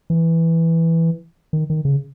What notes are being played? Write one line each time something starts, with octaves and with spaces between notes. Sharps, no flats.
E3
D#3
D#3
C#3